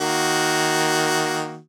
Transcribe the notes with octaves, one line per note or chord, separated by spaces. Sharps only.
D#3 A#3 F#4